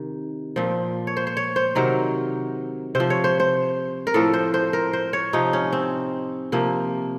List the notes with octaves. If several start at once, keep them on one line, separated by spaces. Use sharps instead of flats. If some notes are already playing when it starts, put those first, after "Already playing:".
Already playing: C3 D#3
A#2 F3
C#5
C5
C5
C#5
C5
C3 D#3 F#3 A#4
C3 C5
F3
C#5
C5
C5
A#4
A2 F3 A4
C5
C5
A#4
C5
C#5
C3 F3 D#4
C#4
C4
C3 F3 A#3